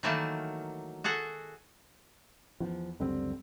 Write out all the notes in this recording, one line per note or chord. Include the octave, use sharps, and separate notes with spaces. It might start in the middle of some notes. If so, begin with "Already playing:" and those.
D#3 E3 F#3 A3 A#3 A5
F#4 G#4 A4 F#5
E2 F3
C#2 F#2 D3 G3 C4